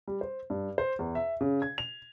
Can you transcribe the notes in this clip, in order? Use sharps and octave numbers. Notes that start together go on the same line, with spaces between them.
G3
C5
G2
C5
E2
E5
C#3
G#6
F7